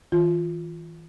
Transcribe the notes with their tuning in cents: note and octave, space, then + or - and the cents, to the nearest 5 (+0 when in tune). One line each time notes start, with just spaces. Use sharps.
E3 -30 F4 +0